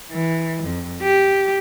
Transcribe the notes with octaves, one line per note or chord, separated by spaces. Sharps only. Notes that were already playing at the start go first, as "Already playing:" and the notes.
E3
F2
G4